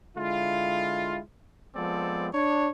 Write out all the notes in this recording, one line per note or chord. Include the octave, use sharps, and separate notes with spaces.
D3 G#3 E4 F4
F3 G#3 B3 C4 A4 D5
D4 C#5